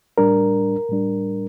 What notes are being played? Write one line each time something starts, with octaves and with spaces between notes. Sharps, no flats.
A2 G3 D4 A#4
A2 G3 D4